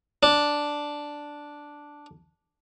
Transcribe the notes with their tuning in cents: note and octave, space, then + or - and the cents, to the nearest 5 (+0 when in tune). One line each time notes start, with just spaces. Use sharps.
D4 +0